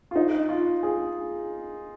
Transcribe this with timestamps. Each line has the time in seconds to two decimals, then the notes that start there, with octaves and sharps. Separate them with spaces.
0.11 F4
0.16 D#4
0.49 F4
0.83 G#4